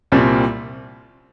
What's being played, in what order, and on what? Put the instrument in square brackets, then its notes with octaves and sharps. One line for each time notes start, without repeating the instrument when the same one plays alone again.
[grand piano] C2 A#2 G3 C4